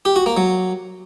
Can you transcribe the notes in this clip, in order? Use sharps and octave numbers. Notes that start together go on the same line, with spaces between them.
G4
F#4
A#3
F#3